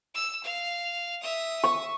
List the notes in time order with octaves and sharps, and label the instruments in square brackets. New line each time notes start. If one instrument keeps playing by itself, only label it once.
[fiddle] E6
F5
E5 D#6
[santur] C#6